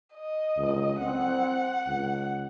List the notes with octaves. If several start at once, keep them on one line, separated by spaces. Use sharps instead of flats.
D#5
C#2
C4 F#5
C#2